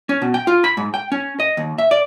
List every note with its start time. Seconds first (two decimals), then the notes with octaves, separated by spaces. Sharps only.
0.09 C#4
0.22 B2
0.34 G5
0.47 F4
0.64 B5
0.77 G#2
0.94 G5
1.12 C#4
1.40 D#5
1.57 D#2
1.78 E5
1.91 D5